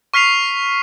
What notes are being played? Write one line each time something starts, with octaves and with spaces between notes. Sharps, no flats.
C#6 F6 B6 C7 F7